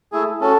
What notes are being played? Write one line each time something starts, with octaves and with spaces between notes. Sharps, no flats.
A3 E4 G#4
C#4 F#4 A4